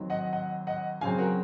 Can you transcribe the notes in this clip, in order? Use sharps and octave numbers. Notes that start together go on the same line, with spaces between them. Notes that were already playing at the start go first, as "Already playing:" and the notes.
Already playing: D#2 D#3 F#3 C4
D#5 F#5
D#5 F#5
D#5 F#5
F#2 C#3 F#3 C4 F5 G#5
F#4 A#4